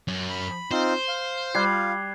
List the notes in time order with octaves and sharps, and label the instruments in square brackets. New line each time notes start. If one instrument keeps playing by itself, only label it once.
[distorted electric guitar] F#2
[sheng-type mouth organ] B5
[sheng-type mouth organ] C4 D#4 F4 [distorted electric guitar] C5
[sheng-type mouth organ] F5
[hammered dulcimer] G3 [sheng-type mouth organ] F4 F5 [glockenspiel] F#6 G#6 C7